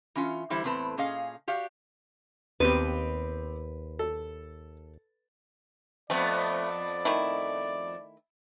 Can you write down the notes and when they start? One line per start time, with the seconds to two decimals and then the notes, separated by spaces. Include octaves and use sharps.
0.15 E3 C#4 F4
0.50 D3 E3 G3 E4 C5
0.64 E2 A2 C4 B4 A5
0.98 A#2 C#4 G#4 D#5 F5
1.48 F#4 G4 D5 F5
2.60 D#2 B3 C4 G4 B4
3.99 A4
6.10 F2 A3 B3 C4 D5
7.05 D#3 A3 E4